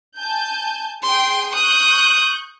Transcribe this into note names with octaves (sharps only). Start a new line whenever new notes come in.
G#5 A5 G6
G#4 G5 C6
C#6 D#6 F#6 G6